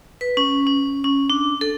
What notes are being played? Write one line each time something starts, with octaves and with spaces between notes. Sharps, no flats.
B4
C#4
C#4
C#4
D4
A4